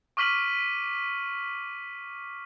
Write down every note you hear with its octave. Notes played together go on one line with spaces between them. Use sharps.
C#6 D6 F6 B6 D#7 F#7